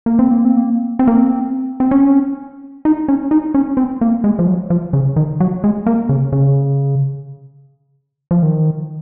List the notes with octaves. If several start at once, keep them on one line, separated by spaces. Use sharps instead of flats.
A#3
C4
A#3
C4
A#3
C4
A#3
C4
C4
C#4
D#4
C#4
D#4
C#4
C4
A#3
G#3
F3
F#3
F3
C#3
D#3
F#3
G#3
A#3
C#3
C#3
F3
D#3